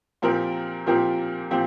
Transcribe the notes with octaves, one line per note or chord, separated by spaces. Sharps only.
A#2 F3 C4 G4 A#4
A#2 F3 C4 G4 A#4
A#2 F3 C4 G4